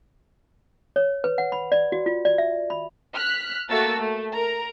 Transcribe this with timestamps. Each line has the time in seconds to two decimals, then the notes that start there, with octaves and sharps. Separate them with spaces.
0.96 C#5
1.24 B4
1.38 F#5
1.52 B5
1.72 D5
1.92 F#4
2.06 F4
2.25 D5
2.38 E5
2.70 B5
3.13 F6 F#6 B6
3.69 A3 A#3 F#4 A5 E6 A6
3.98 A3
4.34 A#4 A#5